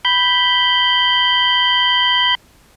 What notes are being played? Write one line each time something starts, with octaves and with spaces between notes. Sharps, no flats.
B5 G6